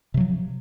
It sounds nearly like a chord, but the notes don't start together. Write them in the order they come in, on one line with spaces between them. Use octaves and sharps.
C3 F#3 F3